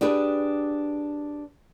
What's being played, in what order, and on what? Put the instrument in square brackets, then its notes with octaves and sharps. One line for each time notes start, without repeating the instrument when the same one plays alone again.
[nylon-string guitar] D4 G4 G#4 B4